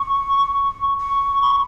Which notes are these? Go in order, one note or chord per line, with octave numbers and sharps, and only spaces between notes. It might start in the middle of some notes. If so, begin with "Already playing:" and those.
Already playing: C#6
C#6
B5
C#6